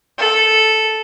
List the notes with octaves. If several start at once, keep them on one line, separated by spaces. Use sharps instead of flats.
A4